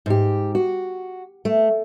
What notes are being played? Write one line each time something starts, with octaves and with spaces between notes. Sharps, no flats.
G#2 G4
F#4
A3